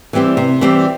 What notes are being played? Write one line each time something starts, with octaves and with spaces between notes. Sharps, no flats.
E3 G3 C4 G4
C3
E3 G3 C4 G4